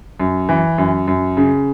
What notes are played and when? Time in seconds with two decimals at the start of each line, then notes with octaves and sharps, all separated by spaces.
0.20 F#2
0.49 E3
0.78 F#2
1.08 F#2
1.37 C#3